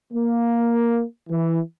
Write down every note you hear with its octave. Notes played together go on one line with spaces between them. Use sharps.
A#3
E3